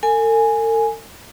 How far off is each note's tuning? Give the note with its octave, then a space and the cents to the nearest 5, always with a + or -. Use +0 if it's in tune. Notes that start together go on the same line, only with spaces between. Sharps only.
A4 +45 G#5 +0